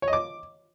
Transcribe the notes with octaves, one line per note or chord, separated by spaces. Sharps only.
C#5
D#5
D6